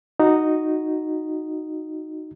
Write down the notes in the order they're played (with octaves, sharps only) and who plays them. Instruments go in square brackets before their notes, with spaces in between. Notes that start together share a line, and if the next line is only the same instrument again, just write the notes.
[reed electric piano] D#4 F#4